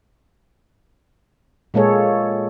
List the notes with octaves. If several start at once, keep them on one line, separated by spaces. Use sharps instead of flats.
A#2 G#3 A#3 G#4 A4 C#5